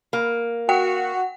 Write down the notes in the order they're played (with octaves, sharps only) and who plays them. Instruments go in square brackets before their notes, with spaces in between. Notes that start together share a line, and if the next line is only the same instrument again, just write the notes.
[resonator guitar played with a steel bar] A#3
[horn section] F#4 [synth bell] F#5 [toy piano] G5